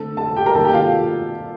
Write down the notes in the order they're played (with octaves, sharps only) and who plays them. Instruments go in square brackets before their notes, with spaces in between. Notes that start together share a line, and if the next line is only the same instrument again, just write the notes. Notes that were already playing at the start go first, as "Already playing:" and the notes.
Already playing: [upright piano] D3 A3 C4 A4
A4 A5
G4 G5
A#4 A#5
D#3 A#3 A4 A5
G4 G5
F4 F5